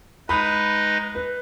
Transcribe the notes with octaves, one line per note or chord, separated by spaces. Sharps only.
G#3 D#4 B4 D#5 B5
B4